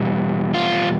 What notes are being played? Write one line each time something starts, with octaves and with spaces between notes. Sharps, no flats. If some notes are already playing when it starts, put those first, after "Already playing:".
Already playing: E2 B2 G3
F4